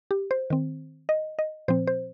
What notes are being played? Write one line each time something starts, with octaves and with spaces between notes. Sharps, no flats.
G4
C5
D#3 C4
D#5
D#5
A#2 F3 C4 C5
C5